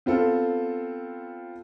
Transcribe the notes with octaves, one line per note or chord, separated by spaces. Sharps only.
B3 C4 F4 A4